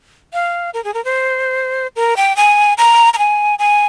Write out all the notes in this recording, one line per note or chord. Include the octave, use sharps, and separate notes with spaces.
F5
A#4
G#4
A#4
C5
A#4
G5
G#5
A#5
A#5
G#5
G#5